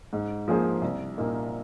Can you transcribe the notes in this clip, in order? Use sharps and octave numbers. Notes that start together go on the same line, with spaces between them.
G#2
F3 A#3 G#4 C5
C2
A#2 A#3 D#4